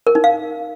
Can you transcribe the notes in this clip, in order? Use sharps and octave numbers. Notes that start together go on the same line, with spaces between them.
A#4
D#4
F5